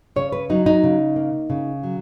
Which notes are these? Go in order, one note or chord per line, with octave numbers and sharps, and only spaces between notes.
C#3 C#5
B4
F#3 D#4
D#4
C#3
A#3
C#3
F#3